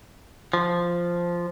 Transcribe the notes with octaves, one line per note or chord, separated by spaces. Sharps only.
F3